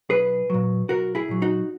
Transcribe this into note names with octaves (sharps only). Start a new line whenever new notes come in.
B1 G#4 B4
A#2 F#3
B1 F#4 A#4
E4 G#4
A#2 F#3
D#4 F#4